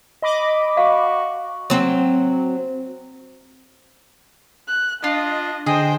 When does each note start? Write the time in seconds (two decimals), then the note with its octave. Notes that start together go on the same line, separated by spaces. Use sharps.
0.22 D#5 B5 D6
0.77 F#4 F5
1.70 F#3 C4
4.68 F#6
5.04 D4 F4 D#5
5.66 D3 G#4 C5 D#5 G5